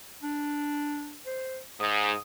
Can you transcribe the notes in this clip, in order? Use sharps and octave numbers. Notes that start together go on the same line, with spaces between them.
D4
C5
G#2 D#6